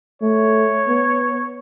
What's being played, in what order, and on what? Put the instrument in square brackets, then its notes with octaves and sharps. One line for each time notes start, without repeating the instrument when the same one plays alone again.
[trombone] A3 [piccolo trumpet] C#5
[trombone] B3